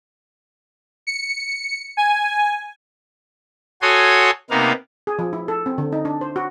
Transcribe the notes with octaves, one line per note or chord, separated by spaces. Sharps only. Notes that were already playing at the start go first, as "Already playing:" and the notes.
C#7
G#5
F#4 A4 C#5 G#5 C6 D#6
C3 A#3 B3 D#4 F5
G#4
F3
E4
A4
C4
D3
D#4
D4
C5
F#4